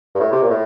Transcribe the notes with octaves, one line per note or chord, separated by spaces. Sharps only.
G2
A2
C3
A#2
A2